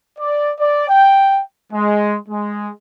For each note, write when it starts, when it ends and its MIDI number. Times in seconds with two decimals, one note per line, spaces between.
0.18 0.51 74
0.59 0.86 74
0.89 1.40 79
1.72 2.16 56
2.29 2.70 56